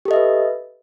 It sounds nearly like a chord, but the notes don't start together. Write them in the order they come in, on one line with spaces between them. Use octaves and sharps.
G4 A4 D#5 E5 B4